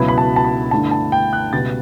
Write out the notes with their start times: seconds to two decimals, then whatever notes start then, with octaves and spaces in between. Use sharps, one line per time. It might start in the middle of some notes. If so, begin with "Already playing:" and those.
Already playing: C#2 B2 F#3 B3 E4
0.08 B5
0.18 A5
0.36 A5
0.44 B5
0.71 G2 D3 A3 E4 A5
0.91 A5
1.12 G5
1.33 F#6
1.53 C#2 B2 G3 B3 A6